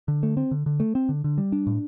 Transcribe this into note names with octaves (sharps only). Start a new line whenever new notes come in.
D3
A3
C4
D3
D3
A3
C4
D3
D3
G3
D4
A2